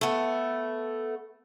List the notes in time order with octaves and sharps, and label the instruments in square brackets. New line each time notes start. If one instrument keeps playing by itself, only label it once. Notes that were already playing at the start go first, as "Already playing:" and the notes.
[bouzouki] A3 B3